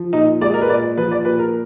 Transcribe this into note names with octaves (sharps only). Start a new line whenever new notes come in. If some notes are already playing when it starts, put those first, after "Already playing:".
Already playing: F3
A#2 D#4
G#3 D5
A#4
B4
A#2 D5
F3 B4
D5
A#2 B4
A#4